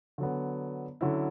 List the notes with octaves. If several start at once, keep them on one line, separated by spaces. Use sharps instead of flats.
D3 F#3 B3
D3 F#3 C#4 E4